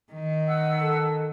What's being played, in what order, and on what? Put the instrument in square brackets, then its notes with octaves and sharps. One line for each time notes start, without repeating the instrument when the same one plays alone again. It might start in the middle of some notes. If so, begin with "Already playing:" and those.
[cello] D#3
[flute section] F#5 E6
[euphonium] A4